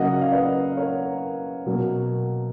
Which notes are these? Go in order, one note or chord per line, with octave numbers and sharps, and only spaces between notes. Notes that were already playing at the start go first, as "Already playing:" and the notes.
Already playing: C#3 F#3 A#3 D#5 F#5
F5
B4 D#5
A#4 C#5
B2 F#3 A#3